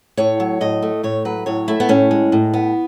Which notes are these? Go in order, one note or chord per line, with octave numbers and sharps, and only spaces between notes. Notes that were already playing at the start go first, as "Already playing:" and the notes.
A2 C#5
F#3
A2 D#5
A3
A2 C#5
F#3 B4
A2 C#5
A3 E4
B3
A2 C#4
G#3
A2
B3